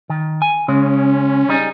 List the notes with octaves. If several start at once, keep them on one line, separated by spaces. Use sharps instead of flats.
D#3
G#5
C#3 G#3 C#4
G3 D#4 G#4